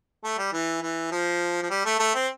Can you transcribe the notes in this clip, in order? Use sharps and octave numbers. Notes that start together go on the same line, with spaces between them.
A3
G3
E3
E3
F3
F3
G3
A3
A3
C4